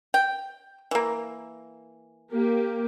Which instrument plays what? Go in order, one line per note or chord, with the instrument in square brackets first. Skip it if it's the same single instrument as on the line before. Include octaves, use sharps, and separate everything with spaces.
[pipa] G5
E3 A#3
[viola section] A#3 G4